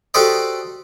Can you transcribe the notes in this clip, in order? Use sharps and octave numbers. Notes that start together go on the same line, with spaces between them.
F#4 G4 A4 C5 D5 D#5